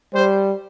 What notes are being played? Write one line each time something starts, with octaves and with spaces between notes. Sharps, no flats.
G3 C5